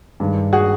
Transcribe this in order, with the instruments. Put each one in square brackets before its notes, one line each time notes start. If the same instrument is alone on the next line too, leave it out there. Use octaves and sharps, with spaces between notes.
[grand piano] G2 D#3 G#3
[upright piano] F#4 G#4